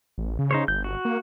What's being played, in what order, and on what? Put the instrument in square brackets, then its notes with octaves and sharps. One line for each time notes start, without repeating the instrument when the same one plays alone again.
[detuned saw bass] A1
C#3
[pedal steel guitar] D#4 C5 C#5
[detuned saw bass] G1 [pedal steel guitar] G6
[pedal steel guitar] F#4
[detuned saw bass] A#3